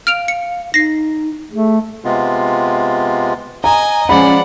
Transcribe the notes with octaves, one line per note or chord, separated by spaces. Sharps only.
F5 F6 D7 F7
C#7
D#4 A#6 C7
A3 G#4
C3 G#3 B3 F4
D#5 G#5 A#5
F3 G#3 C#4 D5 F#5 B5